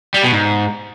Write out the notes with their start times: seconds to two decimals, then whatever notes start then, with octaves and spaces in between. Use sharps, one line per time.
0.14 G3
0.23 B2
0.32 G#2